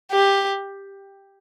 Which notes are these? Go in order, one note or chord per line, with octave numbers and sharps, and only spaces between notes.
G4